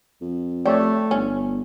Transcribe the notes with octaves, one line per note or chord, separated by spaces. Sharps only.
F2
A3 G4 C#5 D5
G1 C#4